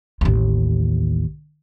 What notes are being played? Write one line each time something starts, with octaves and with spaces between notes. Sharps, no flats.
A1 D#2